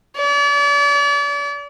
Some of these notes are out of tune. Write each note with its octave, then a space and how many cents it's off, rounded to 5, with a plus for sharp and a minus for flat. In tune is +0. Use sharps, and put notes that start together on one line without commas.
D5 -40